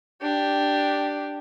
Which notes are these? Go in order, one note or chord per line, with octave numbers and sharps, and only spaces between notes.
D4 G4